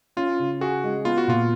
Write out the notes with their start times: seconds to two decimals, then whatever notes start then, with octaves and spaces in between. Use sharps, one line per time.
0.17 C#4 F4
0.39 C#3
0.61 F#4 G#4
0.84 G#3
1.05 B3 F4
1.18 F#4
1.28 A#2 F4